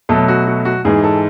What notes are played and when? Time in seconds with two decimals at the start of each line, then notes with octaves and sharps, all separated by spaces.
0.09 B2 F#3 A3 A4
0.28 F#4
0.47 F#4
0.65 F#4
0.85 G#2 E3 G#3 G#4
1.04 A4